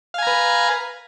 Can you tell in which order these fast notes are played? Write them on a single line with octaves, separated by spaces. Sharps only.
F5 G#5 A#5 B4